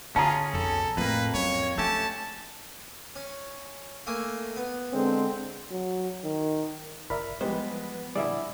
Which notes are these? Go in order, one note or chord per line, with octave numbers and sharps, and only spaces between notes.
D3 C#4 F4 G#4 A5 A#5
B1 F2 A4
F2 A2 A#3 B4
F#3 C#4 C#5
A3 C#4 D4 G4 A5
C#4
A3 A#3 G#5
B3
D3 G#3 C4
F#3
D#3
G1 A#4 D5 E5 B5
F3 G3 G#3 B3 B4 C5
A#2 D3 G3 E4 G#4 D5 E5